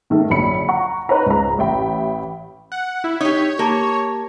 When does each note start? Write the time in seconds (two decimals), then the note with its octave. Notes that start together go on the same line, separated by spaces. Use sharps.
0.10 G#2 D#3 A3
0.30 A#1 F#2 D3 B5 C#7
0.69 F#5 A#5 C#6
1.09 D#4 B4 C5 A#5
1.26 C#2 A#5
1.58 A1 E5 G5 B5
2.72 F#5
3.04 E4
3.21 D#4 G4 C#5
3.59 A#3 G4 A5